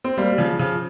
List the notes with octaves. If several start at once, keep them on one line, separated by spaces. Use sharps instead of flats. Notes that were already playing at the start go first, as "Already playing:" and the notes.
C4
G3 A#3
G3
C#3 F3
C#3 F3